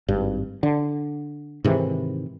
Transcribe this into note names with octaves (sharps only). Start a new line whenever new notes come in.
G#1 G2
D3
G#2 C3 D#3 E3